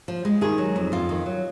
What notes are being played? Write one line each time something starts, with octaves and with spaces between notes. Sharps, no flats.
F3
G#3
D#3 G#4
F#3
F2
F2 F4
D#3
F#3